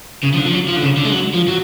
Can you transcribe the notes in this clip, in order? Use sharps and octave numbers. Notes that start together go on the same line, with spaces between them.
C#3
F3
D3
F3
F#3
F3
D3
C#3
D3
G#3
F#3
F3
F#3